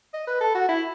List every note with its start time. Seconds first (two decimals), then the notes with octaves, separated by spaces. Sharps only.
0.14 D#5
0.27 B4
0.41 A4
0.55 F#4
0.69 E4